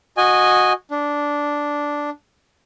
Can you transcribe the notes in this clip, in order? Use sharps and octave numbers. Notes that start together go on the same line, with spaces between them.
F#4 D#5 G#5
D4